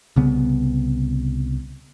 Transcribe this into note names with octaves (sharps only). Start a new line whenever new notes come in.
C2 C#3 B3